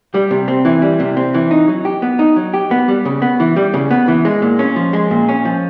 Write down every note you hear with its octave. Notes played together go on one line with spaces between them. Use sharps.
G3
C3
C4
E3
G3
C3
C4
E3
D#4
F#3
G4
B3
D#4
F#3
G4
B3
G3
C#3
B3
E3
G3
C#3
B3
E3
G#3
A#2
C#4
F3
G#3
A#2
C#4
F3